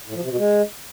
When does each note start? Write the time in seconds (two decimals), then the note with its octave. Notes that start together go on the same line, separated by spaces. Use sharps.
0.07 A2
0.15 F3
0.22 C3
0.30 B2
0.38 G#3